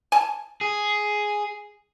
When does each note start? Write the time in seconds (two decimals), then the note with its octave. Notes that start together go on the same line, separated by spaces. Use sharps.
0.12 G#5 A5
0.61 G#4